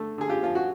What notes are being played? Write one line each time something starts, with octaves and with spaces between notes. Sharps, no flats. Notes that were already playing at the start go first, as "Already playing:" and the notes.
Already playing: D3 A3
D3 G#4
F4 G4
F3 F4
F#4